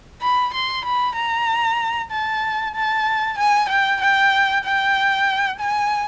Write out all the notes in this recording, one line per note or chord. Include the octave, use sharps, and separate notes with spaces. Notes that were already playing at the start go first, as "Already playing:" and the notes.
B5
C6
B5
A#5
A5
A5
G#5
G5
G5
G5
G#5